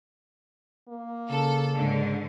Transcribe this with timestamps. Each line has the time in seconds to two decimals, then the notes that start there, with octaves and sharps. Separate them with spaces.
0.89 A#3
1.29 C#3 A4
1.76 G#2 D3